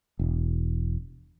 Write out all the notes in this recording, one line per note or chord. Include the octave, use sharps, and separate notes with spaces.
E1